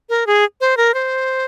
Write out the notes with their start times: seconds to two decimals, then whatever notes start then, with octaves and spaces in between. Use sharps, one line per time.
0.09 A#4
0.27 G#4
0.61 C5
0.77 A#4
0.94 C5